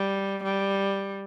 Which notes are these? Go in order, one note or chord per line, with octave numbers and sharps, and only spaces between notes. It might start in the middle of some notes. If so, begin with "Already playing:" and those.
Already playing: G3
G3